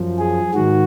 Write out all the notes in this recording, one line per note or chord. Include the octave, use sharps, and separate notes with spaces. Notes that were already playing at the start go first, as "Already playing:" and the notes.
Already playing: F#2 F3
G#4
G#2 D#3 F#4